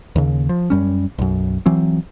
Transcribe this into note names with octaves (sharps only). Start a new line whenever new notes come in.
D#2 C#3
F3
F#2 G3 C#4
B1 F#2
E3 F#3 C4